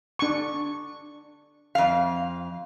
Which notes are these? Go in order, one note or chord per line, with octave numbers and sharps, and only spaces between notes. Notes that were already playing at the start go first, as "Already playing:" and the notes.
D4 C#6
F2 F5